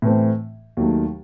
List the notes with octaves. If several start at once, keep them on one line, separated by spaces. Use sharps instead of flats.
A2 E3 A3 C4
D#2 D#3 F#3 A3